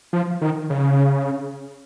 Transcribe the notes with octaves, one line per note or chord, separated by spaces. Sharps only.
F3
D#3
C#3